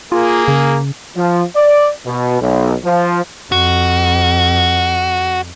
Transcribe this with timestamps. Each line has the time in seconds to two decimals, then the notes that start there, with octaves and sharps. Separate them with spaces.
0.12 A#3 F4 G#4
0.48 C#3
1.16 F3
1.56 D5
2.06 B2
2.41 B1
2.84 F3
3.52 F2 F#4